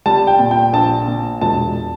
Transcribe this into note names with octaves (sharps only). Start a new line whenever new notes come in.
G3 A5
G5
A#2
G5
A#1 A5
A#2
E1 A5